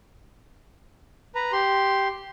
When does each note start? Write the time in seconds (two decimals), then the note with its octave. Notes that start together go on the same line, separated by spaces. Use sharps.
1.35 B4 A#5
1.52 G4 C6